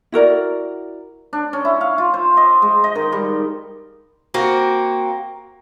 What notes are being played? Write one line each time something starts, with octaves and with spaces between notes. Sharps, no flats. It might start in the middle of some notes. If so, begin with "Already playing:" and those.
E4 F#4 A#4 D5
D4
C#4
E4
F5
F4
C5
D#5
G#3
D#5
D#3
G3
A#3 C4 F#4